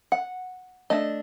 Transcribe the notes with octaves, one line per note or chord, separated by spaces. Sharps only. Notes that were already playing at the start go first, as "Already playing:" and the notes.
F#5
A3 D4 D#5